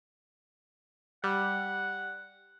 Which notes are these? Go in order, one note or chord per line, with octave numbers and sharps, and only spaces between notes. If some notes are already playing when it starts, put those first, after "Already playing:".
G3 F#5